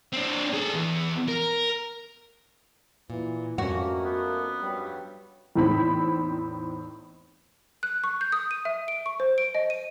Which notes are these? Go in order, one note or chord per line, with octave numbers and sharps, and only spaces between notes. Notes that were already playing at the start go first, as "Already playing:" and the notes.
C4 D4
G#4 A4
E2 E3
A#4
A#2 E3
F2 A3 A#3 C#4 F#4
B3
G2 F#3 G3
E2 A2 C4 D#4 B5
F#6
C#6
G6
D#6
D#7
E5
D7
C#6
C5
D7
D#5
D#7